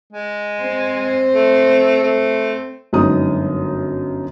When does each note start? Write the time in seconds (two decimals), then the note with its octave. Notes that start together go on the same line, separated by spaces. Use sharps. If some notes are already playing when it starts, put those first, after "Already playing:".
0.13 G#3
0.62 C4 C5
1.34 A3
2.03 A3
2.93 G1 F#2 G#3 D#4 D#6